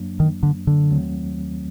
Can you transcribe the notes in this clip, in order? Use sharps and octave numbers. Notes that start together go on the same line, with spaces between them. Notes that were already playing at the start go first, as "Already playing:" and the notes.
Already playing: F#2 F#3 A#3 D4
D#3
D3
D3
D#2 D#3 F#3 A3 C4